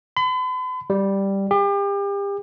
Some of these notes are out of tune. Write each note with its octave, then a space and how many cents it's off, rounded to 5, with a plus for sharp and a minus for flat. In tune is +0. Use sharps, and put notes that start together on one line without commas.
B5 +45
G3 +0
G4 +35